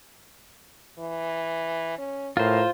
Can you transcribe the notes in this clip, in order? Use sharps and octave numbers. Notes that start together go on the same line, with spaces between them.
E3
C#4
A2 F4 A#4 C5